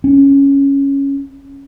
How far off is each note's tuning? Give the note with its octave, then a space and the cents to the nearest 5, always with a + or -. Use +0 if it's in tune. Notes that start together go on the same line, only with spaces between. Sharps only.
C#4 +0